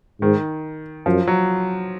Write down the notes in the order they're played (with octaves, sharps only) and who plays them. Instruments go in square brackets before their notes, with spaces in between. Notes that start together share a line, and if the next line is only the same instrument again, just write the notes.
[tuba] G#2 [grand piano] D#3
[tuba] F#2 [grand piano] F3
[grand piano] F#3